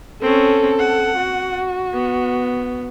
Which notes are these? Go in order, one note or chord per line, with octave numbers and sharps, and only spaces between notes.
C4 C#4 A4
F#5
F#4
B3